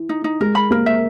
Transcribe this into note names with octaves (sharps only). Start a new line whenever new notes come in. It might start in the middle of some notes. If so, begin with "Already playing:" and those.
Already playing: E3
D#4
D#4
G#3 A#4
B5
A#3 A#4
E5